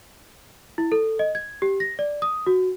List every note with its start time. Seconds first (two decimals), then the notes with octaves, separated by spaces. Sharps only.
0.78 E4
0.92 A4
1.19 D#5
1.35 G#6
1.62 G4
1.80 A#6
1.99 D5
2.22 D#6
2.47 F#4